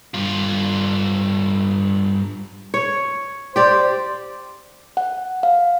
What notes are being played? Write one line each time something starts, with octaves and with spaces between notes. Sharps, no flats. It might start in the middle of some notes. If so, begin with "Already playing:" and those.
G2 F4
C#5
G4 C5 D5
F#5
F5